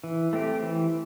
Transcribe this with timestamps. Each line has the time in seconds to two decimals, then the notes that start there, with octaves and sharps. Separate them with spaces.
0.04 E3
0.33 A3 C4 G4
0.63 E3